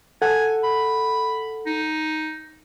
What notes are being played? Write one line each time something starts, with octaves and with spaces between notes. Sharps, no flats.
A4 F#5 G#5
B5
D#4